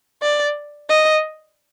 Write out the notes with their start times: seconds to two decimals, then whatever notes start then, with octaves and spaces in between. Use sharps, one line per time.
0.22 D5
0.89 D#5